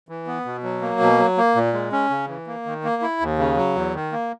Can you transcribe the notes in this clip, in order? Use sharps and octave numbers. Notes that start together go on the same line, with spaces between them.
E3
B3
B2
F#3
A#3
B2
F#3
A#3
A#2
G#3
C#4
C#3
E3
A#3
D#3
A#3
E4
D#2
C#3
F#3
E2
D#3
A#3